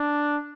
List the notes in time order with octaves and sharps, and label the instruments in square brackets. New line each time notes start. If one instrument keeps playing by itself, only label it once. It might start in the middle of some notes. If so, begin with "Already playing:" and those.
Already playing: [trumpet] D4